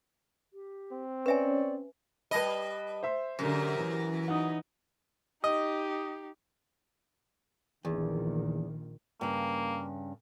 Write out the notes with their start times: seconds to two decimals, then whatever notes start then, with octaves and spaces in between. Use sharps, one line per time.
0.53 G4
0.92 C4
1.26 C#4 B4 C#5 D5 E5 G#5
2.31 G3 B4 D#5 A5 B5
3.03 C5 E5 C6
3.39 F#2 D3 G4 A#4
3.75 E3
4.28 D#4 F#5 D#6
5.44 D#4 G4 D#5
7.85 A#1 E2 D#3
9.21 G2 C#3 A#3